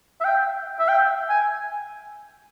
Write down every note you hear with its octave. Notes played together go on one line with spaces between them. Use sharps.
E5
G5
E5
G5
G#5